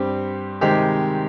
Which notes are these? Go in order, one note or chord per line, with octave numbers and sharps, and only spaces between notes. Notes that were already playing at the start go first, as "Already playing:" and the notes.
Already playing: G2 G3 C4 G4
C3 D#3 G#3 C4 G4